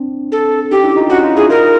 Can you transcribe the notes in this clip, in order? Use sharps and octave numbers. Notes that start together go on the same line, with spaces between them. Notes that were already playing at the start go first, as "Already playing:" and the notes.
Already playing: C4 D4
A4
C#4 D#4 G4
D4 E4
D#4 F4
C#4 D#4 F#4
D#4 F4
E4 F#4 G#4
D#4 F4 A#4